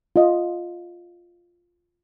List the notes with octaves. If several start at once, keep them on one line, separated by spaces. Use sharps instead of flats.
F4 D#5